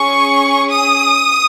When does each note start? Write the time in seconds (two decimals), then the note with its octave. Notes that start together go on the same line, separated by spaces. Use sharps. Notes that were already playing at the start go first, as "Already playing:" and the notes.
Already playing: C#4 G#4 C#6
0.71 D#6